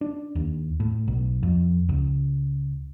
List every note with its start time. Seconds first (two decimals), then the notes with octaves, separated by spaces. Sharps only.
0.01 D4
0.35 D#2
0.80 A2
1.08 B1
1.43 F2
1.89 C#2